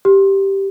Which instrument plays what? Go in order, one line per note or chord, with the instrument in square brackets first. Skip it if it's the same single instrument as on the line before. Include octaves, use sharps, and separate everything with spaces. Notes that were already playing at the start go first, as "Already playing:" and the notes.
[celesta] G4